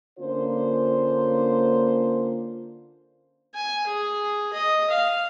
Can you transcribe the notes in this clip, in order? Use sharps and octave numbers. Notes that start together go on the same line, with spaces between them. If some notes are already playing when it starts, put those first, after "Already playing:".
D3 A#3 C#4 D4 F4 C5
G#5
G#4
D#5
F5